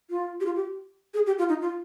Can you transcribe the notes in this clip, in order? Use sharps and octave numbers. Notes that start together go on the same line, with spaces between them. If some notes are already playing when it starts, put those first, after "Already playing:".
F4
G4
F4
G4
G#4
G4
F4
D#4
F4